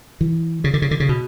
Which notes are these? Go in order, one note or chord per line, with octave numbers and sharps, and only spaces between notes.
E3
C#3
D3
C#3
D3
C#3
B2